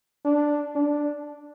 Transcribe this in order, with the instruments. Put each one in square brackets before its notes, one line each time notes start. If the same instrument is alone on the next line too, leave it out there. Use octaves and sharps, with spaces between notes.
[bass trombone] D4
D4